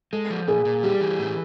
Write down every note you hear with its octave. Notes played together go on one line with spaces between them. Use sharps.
G#3 A4
F3
A#2 G#4
A#2
G3 G4
E3
A2